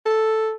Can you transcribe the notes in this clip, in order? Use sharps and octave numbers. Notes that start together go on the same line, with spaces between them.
A4